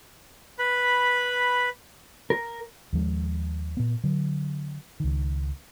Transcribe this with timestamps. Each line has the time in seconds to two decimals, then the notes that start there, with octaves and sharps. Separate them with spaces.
0.59 B4 B5
2.30 A#4
2.93 D#2 F3 G#3
3.77 A#2 B3
4.04 D3 F#3
5.00 C#2 D#3